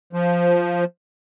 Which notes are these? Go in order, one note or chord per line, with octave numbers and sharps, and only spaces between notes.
F3